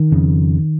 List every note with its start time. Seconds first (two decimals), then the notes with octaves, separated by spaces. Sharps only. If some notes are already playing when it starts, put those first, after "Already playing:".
Already playing: D#3
0.12 F2 C#3